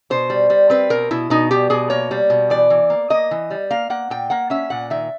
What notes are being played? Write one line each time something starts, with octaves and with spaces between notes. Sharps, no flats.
B2 C5
G3
G3
C4 B4
B2 A#4
B2 E4
B2 D#4
G3 G4
B2 G#4
A#3 C#5
G3
B2
E3 D5
E3
A#3
A#3 D#5
E3
G3
A#3 F5
A#3 F#5
A#2 G5
A#3 F#5
C#4 E5
A#2 F#5
D#3 E5